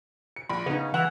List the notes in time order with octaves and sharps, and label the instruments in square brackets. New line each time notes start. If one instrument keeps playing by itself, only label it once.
[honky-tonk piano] C#7
A#1 B5
[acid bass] C#3 [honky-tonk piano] B3 D#4
[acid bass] E3 [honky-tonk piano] F#5 E6 F7